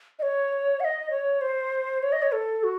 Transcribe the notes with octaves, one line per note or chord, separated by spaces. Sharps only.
D#5
C#5
F#5
D#5
C#5
C5
C#5
D#5
C#5
A4
F#4